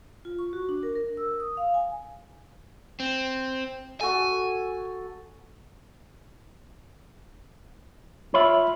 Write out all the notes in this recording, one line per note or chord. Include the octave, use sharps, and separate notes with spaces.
F4
C#6
F#4
D4
A#4
A#4
E6
D#6
F5
G#5
C4
F#4 A4 G#5
F4 C#5 E5 B5